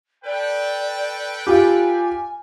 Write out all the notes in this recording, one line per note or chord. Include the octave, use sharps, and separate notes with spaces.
A4 B4 D5 G5
F4 G4 G#5